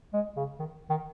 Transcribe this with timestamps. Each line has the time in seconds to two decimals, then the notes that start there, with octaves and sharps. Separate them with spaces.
0.13 G#3
0.36 C#3
0.59 D#3
0.90 D#3